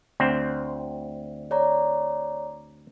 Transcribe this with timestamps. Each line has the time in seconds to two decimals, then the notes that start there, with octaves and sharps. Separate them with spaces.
0.20 D2 C4
1.51 C#5 D5 A#5